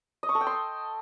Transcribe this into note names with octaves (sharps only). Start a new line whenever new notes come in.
D#5
C#6
A4
G5
C6